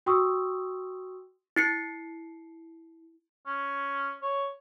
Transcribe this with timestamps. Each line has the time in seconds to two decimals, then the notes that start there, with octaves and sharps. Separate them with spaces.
0.06 F#4 G5 C6 C#6 D#6 E6
1.56 E4 C7 C#7
3.46 C#4
4.22 C#5